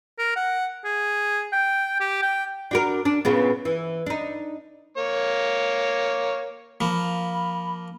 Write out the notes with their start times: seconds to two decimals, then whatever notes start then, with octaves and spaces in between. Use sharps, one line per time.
0.19 A#4
0.36 F#5
0.85 G#4
1.52 G5
2.00 G4
2.22 G5
2.71 D4 F#4 A#4
3.05 D4
3.25 A#2 C#3 B3
3.65 E3
4.06 D4 D#4
4.97 A#3 C#5
6.81 F3 A#3 B5